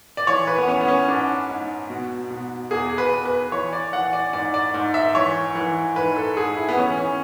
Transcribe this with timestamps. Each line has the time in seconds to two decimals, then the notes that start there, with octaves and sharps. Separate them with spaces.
0.17 D5
0.27 E3 C#5
0.47 B4
0.58 B3
0.68 E3 C#4
0.81 B3
0.88 C#4
1.08 G#2 D4
1.49 G#2
1.90 B2
2.31 B2
2.71 E2 G#4
2.98 B4
3.12 E2
3.25 B4
3.52 E3 C#5
3.73 D5
3.93 E3 F#5
4.13 D5
4.33 G#2 D5
4.54 D5
4.74 G#2
4.94 E5
5.15 E3 C#5
5.55 E3
5.96 G#2 B4
6.16 A4
6.37 G#2 G#4
6.57 E4
6.69 B3
6.77 E3 C#4
6.98 C#4